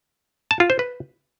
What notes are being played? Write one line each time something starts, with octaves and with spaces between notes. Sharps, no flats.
A5
F4
C5
B4